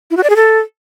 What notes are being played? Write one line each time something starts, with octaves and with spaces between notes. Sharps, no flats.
E4
F#4
D5
G#4
A4